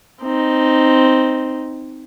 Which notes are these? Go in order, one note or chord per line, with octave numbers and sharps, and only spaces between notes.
C4 D#4